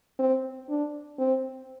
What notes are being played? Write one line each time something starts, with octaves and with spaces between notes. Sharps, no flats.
C4
D4
C4